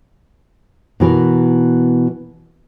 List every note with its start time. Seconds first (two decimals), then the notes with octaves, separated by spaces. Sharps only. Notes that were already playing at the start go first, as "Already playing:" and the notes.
1.00 B2 E3 A#4